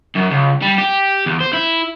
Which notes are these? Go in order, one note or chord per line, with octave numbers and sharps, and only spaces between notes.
F#2
C#2
G3
G4
E2
C5
E4